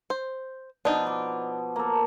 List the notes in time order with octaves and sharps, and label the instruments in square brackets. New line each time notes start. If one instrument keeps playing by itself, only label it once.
[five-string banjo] C5
[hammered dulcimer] B2 F3 [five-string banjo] D4 D#4
[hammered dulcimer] D6
A#3 A4